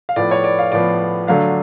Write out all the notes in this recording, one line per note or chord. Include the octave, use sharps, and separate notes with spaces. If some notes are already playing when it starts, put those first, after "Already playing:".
F5
A2 F3 B3 D5
C#5
D5
F5
A2 F3 B3 D5
D3 F#3 A3 D4 F5